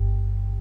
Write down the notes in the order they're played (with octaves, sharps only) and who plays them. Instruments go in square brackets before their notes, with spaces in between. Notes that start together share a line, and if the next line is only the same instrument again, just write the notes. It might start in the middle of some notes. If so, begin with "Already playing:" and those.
Already playing: [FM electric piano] G1 G2